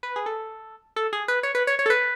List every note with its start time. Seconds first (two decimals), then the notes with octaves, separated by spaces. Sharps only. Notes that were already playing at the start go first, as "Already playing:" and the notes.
0.03 B4
0.16 G#4
0.26 A4
0.96 A4
1.13 G#4
1.28 B4
1.43 C#5
1.55 B4
1.67 C#5
1.79 C#5
1.86 A4
1.90 B4